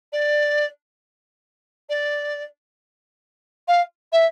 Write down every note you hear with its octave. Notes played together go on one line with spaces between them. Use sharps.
D5
D5
F5
E5